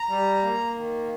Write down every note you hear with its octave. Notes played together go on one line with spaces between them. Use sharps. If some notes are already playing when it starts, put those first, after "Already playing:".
Already playing: A#5
G3
A#3
D#3